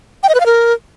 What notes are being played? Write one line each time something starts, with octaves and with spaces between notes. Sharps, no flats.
G5
D#5
B4
F5
A#4